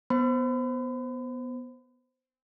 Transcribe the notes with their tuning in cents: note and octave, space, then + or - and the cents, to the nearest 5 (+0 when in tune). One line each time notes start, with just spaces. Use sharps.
B3 +0 C5 +0 B5 +40